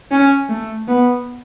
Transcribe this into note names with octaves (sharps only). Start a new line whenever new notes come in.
C#4
A3
B3